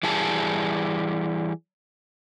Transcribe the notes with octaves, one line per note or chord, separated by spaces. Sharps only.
E3 G3 G#4 A5